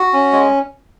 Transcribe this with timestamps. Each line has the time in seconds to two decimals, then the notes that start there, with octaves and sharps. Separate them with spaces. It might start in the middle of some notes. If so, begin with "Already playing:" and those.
Already playing: F#4
0.13 C#4
0.32 G#3